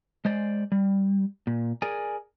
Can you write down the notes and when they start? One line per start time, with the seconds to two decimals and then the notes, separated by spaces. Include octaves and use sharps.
0.25 G#3 C5 D5
0.72 G3
1.47 A#2
1.82 G#4 A#4 D5 G#5